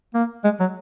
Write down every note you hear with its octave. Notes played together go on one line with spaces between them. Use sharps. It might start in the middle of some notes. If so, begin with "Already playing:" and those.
A#3
G#3
F#3